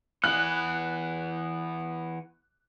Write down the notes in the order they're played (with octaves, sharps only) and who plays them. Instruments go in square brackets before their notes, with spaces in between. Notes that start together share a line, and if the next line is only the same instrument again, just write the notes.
[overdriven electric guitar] E3 B3 [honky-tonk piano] F#6